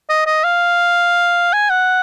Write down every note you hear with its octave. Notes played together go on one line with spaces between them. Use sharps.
D#5
D#5
F5
G#5
F#5